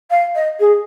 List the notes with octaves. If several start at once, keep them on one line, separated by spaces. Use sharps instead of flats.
F5
D#5
G#4